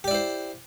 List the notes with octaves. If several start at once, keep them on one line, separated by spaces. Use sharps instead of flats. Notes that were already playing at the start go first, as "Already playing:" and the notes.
E4 G4 C5 D5